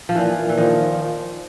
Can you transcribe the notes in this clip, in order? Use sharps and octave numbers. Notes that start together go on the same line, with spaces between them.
F3
A#2 E3
A#2
E3
D#3 F3